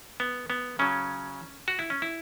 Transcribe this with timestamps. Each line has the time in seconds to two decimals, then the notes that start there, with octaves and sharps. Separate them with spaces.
0.20 B3
0.50 B3
0.79 C#3 F#3 C#4
1.68 F#4
1.79 E4
1.90 C#4
2.02 E4